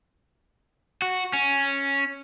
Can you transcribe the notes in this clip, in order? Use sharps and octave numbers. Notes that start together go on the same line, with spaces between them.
F#4
C#4